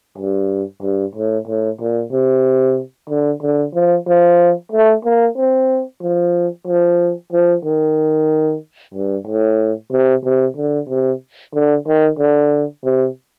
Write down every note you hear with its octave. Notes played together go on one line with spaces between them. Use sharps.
G2
G2
A2
A2
A#2
C3
D3
D3
F3
F3
A3
A#3
C4
F3
F3
F3
D#3
G2
A2
C3
C3
D3
C3
D3
D#3
D3
C3